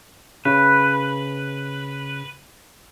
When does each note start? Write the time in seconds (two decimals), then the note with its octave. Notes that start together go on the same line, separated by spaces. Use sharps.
0.45 C#3 B4